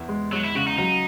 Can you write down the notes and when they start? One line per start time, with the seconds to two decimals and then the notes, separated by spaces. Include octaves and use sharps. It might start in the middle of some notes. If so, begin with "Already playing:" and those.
Already playing: E2 E4
0.09 G#3
0.32 F#3 G#3
0.44 E4
0.55 C#3 F#4
0.67 D#4
0.78 F#3 D#4